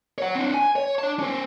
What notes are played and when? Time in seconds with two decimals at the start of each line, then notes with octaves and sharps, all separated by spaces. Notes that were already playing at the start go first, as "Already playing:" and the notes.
0.18 C#5 F#5
0.35 C4 D4
0.54 G#5
0.76 C#5
0.99 D4 A5
1.19 C#4 C5